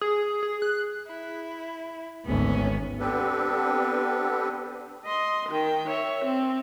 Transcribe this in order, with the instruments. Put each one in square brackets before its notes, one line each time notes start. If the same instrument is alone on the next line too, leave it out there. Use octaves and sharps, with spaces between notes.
[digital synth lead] G#4
G#4
F#6
[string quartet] E4
[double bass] G#1 D2 [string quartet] B3 C#4
[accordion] B3 C4 D4 G4 A4 B4
[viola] D#5 C6
D#3 G5
C#5 E5
C4